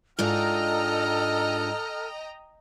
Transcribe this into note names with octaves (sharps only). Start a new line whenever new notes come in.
G#2 D4 F4 A4 D#5 G5 A#5 F6